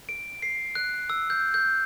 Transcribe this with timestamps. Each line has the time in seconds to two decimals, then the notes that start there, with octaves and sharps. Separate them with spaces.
0.09 D7
0.42 C7
0.75 F#6
1.10 E6
1.30 G6
1.54 G6